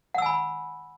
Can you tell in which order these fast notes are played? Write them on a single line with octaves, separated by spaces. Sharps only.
F#5 E6 G#5 B5